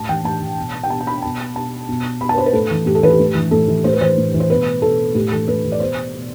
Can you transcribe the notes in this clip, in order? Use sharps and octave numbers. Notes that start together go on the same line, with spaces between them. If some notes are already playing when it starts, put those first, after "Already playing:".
Already playing: A2 A5
E3 G5
A2 A5
E3
B2
G5
B2 A5
A5
B5
B2 A5
B2 A5
B2
B2 B5
A5
B4
C5
B4
A2 A4
E3
A2 G4
A4
E3 B4
G4
A2
E3
A2 A4
E3
A2 C5
B4
E3 C5
A2
E3
C5
B2 B4
B2 A4
A2 G4
E3 A4
A2 B4
E3
D5
B2 C5
B2